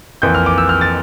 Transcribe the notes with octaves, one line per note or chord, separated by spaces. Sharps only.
F2 E3 A#3 G6
F6
D6
E6
F6
A6